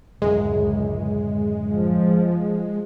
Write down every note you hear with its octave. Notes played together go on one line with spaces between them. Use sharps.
D1 C#2 F#2 G#3
F3